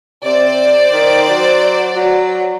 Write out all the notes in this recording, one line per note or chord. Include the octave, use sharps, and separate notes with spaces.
C3 C5 D5
D#3
F#3
F#3